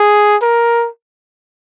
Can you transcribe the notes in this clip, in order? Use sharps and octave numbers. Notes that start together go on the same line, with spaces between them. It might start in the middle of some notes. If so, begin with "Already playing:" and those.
Already playing: G#4
A#4